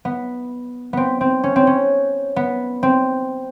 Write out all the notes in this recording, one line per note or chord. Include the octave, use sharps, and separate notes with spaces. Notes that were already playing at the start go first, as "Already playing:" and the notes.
B3
B3 C4
C4
C#4
C4
C#4
B3
C4